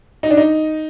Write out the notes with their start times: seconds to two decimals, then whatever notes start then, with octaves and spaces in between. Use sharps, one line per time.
0.23 D#4
0.30 D4
0.37 D#4